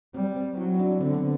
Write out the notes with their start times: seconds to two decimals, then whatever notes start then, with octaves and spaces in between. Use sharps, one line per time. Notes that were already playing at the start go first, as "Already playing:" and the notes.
0.14 G3 C4
0.36 C4
0.57 F#3 E4
0.74 E4
0.79 D4
1.01 D3 C4
1.14 B3